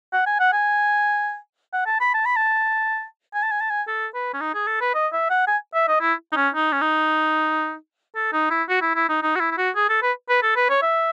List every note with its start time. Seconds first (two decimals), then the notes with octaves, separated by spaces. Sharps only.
0.13 F#5
0.26 G#5
0.40 F#5
0.53 G#5
1.73 F#5
1.86 A5
2.00 B5
2.14 A5
2.25 B5
2.36 A5
3.34 G#5
3.43 A5
3.51 G#5
3.61 A5
3.70 G#5
3.88 A4
4.14 B4
4.34 C#4
4.41 D#4
4.54 G#4
4.67 A4
4.81 B4
4.95 D#5
5.13 E5
5.30 F#5
5.47 G#5
5.74 E5
5.88 D#5
6.01 E4
6.32 D#4
6.36 C#4
6.54 D#4
6.72 C#4
6.81 D#4
8.16 A4
8.33 D#4
8.50 E4
8.69 F#4
8.82 E4
8.95 E4
9.09 D#4
9.23 D#4
9.35 F#4
9.40 E4
9.51 E4
9.58 F#4
9.76 G#4
9.89 A4
10.03 B4
10.29 B4
10.43 A4
10.56 B4
10.69 C#5
10.82 E5